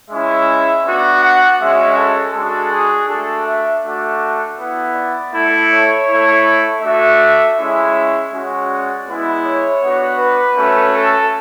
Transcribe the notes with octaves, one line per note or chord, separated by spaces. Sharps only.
G#3 C#4 E4 E5
B3 D4 F#4
F#5
G#3 C#4 F#4 E5
A4
G#3 D4 F#4 A4
G#4
A3 D4 F#4 A4
E5
A3 D4 F#4
B3 E4
D5
A3 E4
C#5
A3 E4
A3 D4 F#4 E5
G#3 C#4 E4 E5
G#3 C#4 F#4
D5
G#3 B3 E4
C#5
B3 D4 F#4
B4
A3 C#4 F#4
A4